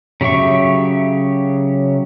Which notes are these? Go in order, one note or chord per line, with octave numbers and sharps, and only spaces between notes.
C#3 F#3 G4 E5 C#6